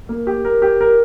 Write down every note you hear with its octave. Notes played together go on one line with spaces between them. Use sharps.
A#3
G4
A#4
G4
A#4